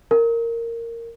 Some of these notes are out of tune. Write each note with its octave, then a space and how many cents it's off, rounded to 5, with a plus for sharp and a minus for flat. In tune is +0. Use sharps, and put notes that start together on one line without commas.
A#4 -10